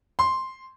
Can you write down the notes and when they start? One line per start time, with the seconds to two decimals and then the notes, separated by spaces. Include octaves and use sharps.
0.19 C6